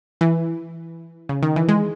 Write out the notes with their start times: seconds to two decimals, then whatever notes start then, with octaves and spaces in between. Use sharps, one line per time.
0.21 E3
1.29 C#3
1.43 D#3
1.56 E3
1.69 G#3